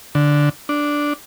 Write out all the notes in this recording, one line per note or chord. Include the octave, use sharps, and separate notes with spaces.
D3
D4